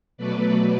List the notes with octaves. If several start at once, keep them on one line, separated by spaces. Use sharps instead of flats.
B2 F#3 A3 B4 D5